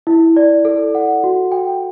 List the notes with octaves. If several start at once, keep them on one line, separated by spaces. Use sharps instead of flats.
E4
D5
A4
F#5
F#4
G5